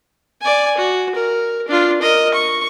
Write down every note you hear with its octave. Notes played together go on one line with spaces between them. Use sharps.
D5 G#5
F#4
A#4
D4 F4
A#4 D#5
C#6